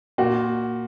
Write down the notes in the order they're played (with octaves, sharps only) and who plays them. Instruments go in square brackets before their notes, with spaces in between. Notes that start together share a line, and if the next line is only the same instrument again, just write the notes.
[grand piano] A#2 F#4